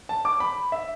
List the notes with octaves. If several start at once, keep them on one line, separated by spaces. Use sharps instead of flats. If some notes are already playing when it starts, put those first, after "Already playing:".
A5
D6
B5
E5